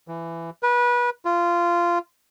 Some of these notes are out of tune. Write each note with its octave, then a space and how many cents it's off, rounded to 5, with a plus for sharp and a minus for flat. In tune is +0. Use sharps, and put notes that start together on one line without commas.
E3 +15
B4 -25
F4 -15